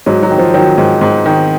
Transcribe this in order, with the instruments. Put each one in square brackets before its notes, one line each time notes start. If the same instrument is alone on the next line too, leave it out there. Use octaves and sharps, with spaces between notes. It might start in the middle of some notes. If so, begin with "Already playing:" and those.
[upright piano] G#2 F#3
F#3
D#3
F3
D#3 F#3
G#2
G#2
D#3